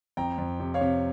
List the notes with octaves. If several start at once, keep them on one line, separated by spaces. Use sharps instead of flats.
F2 G5 A#5
F2
C3
C#5 F5
C3